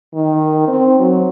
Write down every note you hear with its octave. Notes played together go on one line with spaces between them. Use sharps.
D#3
C4
F#3